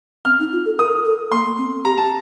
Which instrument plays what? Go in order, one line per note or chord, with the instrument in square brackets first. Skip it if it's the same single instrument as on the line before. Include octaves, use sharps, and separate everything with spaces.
[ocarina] C4 [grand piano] F6
[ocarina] D#4
F4
A4
[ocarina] A#4 [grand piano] D#6
[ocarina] A4
[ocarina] A#3 [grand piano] C6
[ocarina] C4
[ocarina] G4 [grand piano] A#5
[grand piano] A5